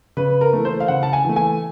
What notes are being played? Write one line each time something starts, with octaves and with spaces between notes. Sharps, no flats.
C#3 B4
A#4
E3 A3
C5
F5
C#3 F#5
A5
G#5
E3 A3
G#5